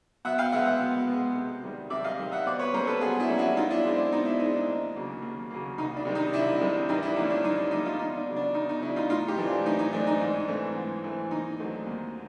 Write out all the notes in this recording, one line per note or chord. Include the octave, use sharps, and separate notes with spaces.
B2 E5 F#5
F5 G5
G#3 B3 E5 F#5
E5 F#5
B2
G#3 B3
C3
D#3 G3
C3 D5 E5
D#5 F5
D#3 G3
E5 F#5
B2 C5 D5
B4 C#5
G3 A#3 C#4 A#4 C5
A4 B4
B2 F#4 G#4
D4 E4
G3 A#3 C#4
E4 F#4
B2 D#4 F4
D4 E4
G#3 C4
D4
B2 D#4
D4 E4
G#3 C4 D#4
D4
D#2
C#3 F#3 A#3
D#2
C#3 F#3 A#3
C2 D#4
D4
C3 D#3 G3
D#4
C2 D4 E4
C3 D#3 G3
G2 D#4
D4 E4
D3 F3 A#3 C#4 D#4
D4
G2 D#4
D4
D3 F3 A#3 C#4 D#4
D#4 F4
E2 D#4
D4
C#3 F#3
D4
E2 D#4
D#4
C#3 F#3 D4 E4
D#4 F4
A2 D#4 F4
F4 G4
E3 A3 C4
D4
A2 D#4
D#4
E3 A3 C4 D4
D#4
G#2 D4
E3 A3 C4
G#2
E3 A3 C4
D#2 D#4
D3 F#3 A3 C4
D#2